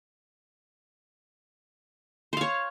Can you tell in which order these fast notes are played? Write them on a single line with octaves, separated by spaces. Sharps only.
C5 F5 C#5